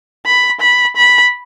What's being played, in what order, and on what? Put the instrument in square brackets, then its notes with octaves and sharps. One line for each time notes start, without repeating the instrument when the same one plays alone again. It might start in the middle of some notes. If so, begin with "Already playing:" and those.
[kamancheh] B5
B5
B5